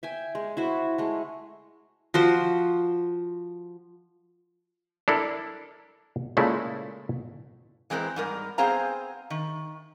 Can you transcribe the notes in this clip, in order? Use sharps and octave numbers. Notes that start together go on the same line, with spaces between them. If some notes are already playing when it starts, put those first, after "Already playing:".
E5 G5 G#5
G#3
E4 F#4 C5
G#3 A3
F3 F#4 C5
D4 E4 A4 A#4
A#2 C#3 G#3 A3 E4
E3 G#3 C4 G#4 A#4
G#2 G3 A#4
B3 C4 G#4 C5 F5 A#5
D#3